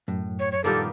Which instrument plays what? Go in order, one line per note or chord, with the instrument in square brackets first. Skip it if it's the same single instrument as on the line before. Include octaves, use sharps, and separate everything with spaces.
[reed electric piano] F#2 [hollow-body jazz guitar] A2
[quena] C#5
C#5
[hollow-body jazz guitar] G2 A#2 D#3 [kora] A#3 B3 G4 [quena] A4